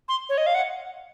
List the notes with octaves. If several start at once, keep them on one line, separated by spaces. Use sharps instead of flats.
C6
C#5
D#5
F5
F#5